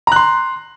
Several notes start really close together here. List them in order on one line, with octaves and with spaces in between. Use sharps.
A#5 F#6 C6